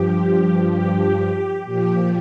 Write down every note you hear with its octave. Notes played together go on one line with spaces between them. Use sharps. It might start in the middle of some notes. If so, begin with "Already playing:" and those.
Already playing: G2 F3 G4
G4
A#2 F3 G4